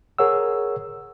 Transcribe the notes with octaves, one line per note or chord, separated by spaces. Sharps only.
G#4 A#4 C#5 F#5 E6